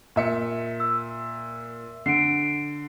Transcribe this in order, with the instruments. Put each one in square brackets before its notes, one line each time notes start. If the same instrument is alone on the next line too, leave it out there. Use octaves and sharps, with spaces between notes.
[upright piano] A#2 E5 C#7
[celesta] E6
[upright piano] D3 [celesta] C7 D7